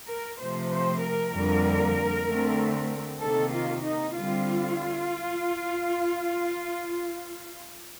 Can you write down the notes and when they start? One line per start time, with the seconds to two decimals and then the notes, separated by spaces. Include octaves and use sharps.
0.09 A#4
0.40 C3 F3 A3 C5
0.72 C5
1.02 A#4
1.34 F2 D3 G3 A#3
2.27 D3 A3 C4
3.21 C3 D#3 A#3 A4
3.52 F4
3.83 D#4
4.14 D3 G3 C4 F4